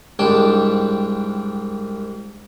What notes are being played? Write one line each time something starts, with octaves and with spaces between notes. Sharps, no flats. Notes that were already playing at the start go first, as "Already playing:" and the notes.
C2 G#2 D4 G5 A5